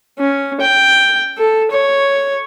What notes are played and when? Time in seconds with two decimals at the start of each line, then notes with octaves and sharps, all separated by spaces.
0.19 C#4
0.61 G5
1.38 A4
1.71 C#5